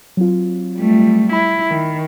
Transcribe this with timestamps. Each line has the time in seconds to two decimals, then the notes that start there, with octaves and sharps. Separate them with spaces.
0.17 F#3 C4 F4
0.76 G3 A3
1.33 E4 B5
1.68 D#3